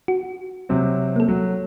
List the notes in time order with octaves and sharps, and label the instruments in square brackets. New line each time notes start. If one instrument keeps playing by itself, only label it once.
[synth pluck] F#4
[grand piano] C3 F#3 C4
[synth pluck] A#3 A4
[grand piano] F#3